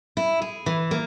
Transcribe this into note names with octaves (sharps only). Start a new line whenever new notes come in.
E4
G#4
E3
A#3